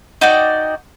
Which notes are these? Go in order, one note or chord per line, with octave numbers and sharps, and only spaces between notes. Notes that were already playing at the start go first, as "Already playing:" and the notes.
D#4 F#4 D5 G5